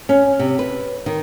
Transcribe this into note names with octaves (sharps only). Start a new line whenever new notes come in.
C#4
C3
B4
D#3